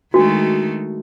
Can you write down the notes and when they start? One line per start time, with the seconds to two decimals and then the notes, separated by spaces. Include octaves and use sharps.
0.14 D#3 G#3 A3 D4 F#4